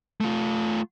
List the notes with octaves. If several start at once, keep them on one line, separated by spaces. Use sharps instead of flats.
A3 F4